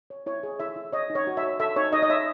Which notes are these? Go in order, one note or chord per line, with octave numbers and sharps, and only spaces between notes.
C#5
E4 C#5
G#4
E4 E5
E4
C#5 D#5
D#4
C#5
F#4
E5
C#5
A4 E5
D#4 C#5
D#4 D#5
D#5
C#5 E5